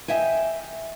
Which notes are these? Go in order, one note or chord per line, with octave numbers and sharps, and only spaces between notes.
D#5 E5 G5 G#5